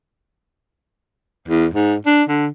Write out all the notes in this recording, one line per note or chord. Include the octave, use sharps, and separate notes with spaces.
E2
G#2
D4
D3